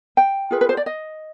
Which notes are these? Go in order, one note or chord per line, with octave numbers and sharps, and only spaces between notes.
G5
F4 G#4 B4
B4
C5
D5
D#5